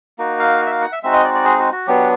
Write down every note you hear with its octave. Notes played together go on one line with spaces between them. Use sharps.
A#3 D#4 F#4
F5
E5
F5
F#5
E5
G#3 C4 D#4 F#4 E5
D#5
D5
D5
G#4
F#4
F#4
F#3 B3 D4 G4